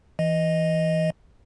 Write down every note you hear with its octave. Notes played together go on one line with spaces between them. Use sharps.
E3 D#5